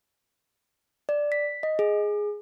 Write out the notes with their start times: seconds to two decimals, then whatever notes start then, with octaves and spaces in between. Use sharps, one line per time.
1.09 D5
1.32 B6
1.63 D#5
1.79 G#4